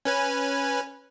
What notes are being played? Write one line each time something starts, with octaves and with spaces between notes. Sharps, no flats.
C#4 B4 G#5